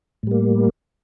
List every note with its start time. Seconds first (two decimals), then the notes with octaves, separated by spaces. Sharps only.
0.23 A2
0.27 G3
0.31 A#3